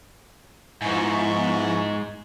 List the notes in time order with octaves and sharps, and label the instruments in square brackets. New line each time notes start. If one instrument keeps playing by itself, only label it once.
[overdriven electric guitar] G#2 [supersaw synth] F3 B3 E4 [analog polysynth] G#5 A#5 C#6